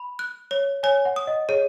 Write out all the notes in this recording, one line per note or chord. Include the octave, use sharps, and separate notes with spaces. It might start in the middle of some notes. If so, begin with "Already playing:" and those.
Already playing: B5
F#6
C#5
C#5 G#5
F#5
D#6
D#5
G#4 C#5